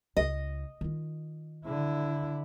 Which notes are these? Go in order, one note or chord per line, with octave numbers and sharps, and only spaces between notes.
C#2 D#5
D#3 F4
D3 E4